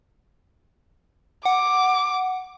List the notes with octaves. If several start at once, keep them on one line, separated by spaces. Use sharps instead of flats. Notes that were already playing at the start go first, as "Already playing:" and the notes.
F#5 D6